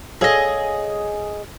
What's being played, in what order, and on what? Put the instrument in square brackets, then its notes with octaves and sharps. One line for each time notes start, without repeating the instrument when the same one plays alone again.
[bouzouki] G#4 D#5 [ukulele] A4 C#5 F5